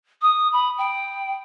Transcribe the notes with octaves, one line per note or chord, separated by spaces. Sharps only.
D#6
B5
G5